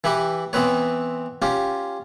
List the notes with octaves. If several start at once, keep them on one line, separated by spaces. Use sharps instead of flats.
E3 E4 G4 B4
E3 B3 C4 B4 C#5
C#4 F4 G4